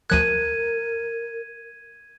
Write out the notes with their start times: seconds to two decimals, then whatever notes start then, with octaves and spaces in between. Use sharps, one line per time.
0.10 D2 F3 A#4 F#6 G#6 D#7